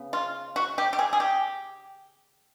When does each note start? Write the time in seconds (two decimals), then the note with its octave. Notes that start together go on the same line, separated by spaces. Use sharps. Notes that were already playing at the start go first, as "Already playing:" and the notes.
Already playing: C#3 B3
0.13 F4
0.56 F#4
0.78 G4
0.93 G4
0.99 G#4
1.13 G#4
1.20 G4